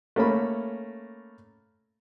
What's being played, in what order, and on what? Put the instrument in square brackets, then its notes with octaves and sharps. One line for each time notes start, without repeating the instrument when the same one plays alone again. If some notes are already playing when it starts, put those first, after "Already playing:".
[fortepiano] A3 A#3 C#4 B5